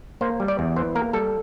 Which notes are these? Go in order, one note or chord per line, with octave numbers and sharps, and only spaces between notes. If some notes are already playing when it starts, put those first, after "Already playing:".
A#3 C5
G3
D5
E2
E3 C5
A#3 A#4
G3 A4